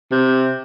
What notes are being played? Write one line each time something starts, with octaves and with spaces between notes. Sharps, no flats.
C3